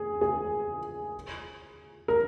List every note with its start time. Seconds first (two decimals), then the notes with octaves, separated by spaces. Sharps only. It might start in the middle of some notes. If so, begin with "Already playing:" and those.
Already playing: G#4
0.21 G#4
2.08 A#4